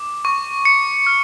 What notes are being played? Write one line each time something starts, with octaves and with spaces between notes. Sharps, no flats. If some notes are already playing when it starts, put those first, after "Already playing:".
Already playing: D6
C#6
C#7
F6